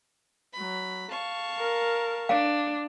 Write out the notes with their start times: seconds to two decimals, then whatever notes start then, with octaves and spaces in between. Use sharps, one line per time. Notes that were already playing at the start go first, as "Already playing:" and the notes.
0.53 F#3 B5
1.12 F5 A5 C#6
1.58 A#4
2.29 D4 F5